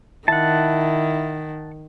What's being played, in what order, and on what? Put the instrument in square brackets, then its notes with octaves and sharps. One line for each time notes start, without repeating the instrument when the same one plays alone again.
[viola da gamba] D#3 [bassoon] E4 [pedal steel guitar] F#5 A5